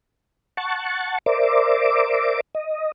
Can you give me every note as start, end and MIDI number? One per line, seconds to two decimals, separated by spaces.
0.57 1.18 78
0.57 1.18 81
0.57 1.18 85
1.26 2.41 70
1.26 2.41 72
1.26 2.41 74
1.26 2.41 76
1.26 2.41 86
2.55 2.92 75